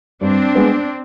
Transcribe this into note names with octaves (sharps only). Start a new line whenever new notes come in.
G2 C4 D4
G#3 B3